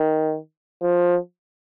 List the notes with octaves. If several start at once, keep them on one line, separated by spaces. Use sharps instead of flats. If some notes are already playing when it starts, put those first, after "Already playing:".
Already playing: D#3
F3